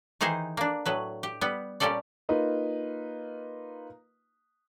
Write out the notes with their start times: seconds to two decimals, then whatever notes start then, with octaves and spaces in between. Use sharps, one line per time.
0.21 D#3 E3 D#4 G#4 C5
0.57 A#3 D4
0.86 A2 F#3 B4
1.23 G4
1.41 G3 B3
1.80 A#2 G3 C#4 G4 A4 D5
2.29 A#3 D#4 F4 B4